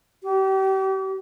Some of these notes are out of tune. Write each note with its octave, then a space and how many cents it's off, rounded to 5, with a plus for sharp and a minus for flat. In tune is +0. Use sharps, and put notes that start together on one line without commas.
G4 -35